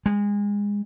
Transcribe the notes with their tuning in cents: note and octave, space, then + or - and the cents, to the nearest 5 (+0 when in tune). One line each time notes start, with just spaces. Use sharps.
G#3 -25